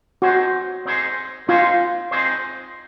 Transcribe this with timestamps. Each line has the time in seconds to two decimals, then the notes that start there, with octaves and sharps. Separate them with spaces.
0.22 C4 D#4 F#4 G#4 C5
0.85 C4 D#4 G#4 C5
1.48 C4 D#4 F4 G#4 C5
2.11 C4 D#4 G#4 C5